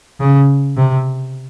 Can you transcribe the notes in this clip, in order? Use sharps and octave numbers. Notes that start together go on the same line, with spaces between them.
C#3
C3